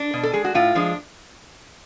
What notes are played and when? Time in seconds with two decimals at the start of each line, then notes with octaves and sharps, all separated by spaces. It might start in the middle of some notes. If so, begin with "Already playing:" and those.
Already playing: D4
0.14 B2
0.23 A4
0.33 G#3 G#4
0.44 F#4
0.55 A2 F4
0.75 F3 G#3 D4